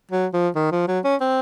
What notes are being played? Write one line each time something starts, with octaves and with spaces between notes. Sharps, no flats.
F#3
F3
D#3
F3
F#3
C#4
C4